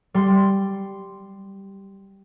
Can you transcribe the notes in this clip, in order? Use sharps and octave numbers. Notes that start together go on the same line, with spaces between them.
G3 C6